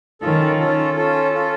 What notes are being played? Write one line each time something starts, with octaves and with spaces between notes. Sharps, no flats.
D#3 C#4 F4 A4
C#4 F4 A4
C#4 F4 A4
C#4 F4 A4